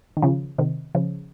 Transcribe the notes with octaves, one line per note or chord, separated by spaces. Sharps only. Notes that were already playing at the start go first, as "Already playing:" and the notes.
D#3
C#3 F3
C3 D#3
C#3 F3